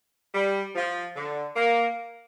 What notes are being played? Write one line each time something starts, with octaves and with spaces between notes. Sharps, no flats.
G3
F3
D3
A#3